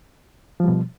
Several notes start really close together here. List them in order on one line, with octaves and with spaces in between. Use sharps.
F3 G3 B2